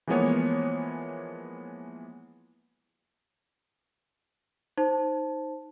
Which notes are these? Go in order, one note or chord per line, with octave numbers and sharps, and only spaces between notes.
E3 F3 G#3 A#3 B3 C#5
D#4 C5 A5